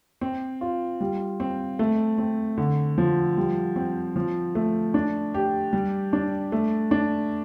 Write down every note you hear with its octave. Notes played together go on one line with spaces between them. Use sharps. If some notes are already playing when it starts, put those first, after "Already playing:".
C4
F4
G3
C4
A3
C4
D3
F3
G3
C4
F3
A3
D4
G4
G3
D4
A3
D4